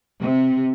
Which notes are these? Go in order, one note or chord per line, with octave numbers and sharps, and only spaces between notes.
C3